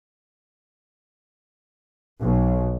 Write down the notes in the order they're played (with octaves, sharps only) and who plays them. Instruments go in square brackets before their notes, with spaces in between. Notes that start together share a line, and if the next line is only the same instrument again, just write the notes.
[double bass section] B1